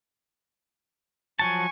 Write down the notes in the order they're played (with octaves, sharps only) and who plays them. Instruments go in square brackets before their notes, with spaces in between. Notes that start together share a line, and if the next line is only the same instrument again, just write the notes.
[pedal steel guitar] F3 F#3 A5 [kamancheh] G#5 C#6